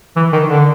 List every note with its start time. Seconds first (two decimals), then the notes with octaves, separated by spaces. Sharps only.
0.16 E3
0.33 D#3
0.49 D3